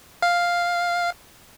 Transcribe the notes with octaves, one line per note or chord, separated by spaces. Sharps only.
F5